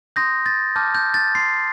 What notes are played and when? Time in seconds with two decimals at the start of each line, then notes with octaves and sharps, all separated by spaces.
0.16 C6 D#6 G6 A#6
0.46 A6
0.76 A5 D6 F6 G6
0.95 G6
1.14 A6
1.35 C6 G6 C7